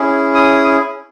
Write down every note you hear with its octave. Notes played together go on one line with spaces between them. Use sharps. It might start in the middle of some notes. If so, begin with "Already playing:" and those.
Already playing: C#4 E4 G#4
D#6